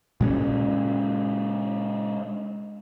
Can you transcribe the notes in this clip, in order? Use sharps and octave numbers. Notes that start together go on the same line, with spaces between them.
A#2 G#3 C#4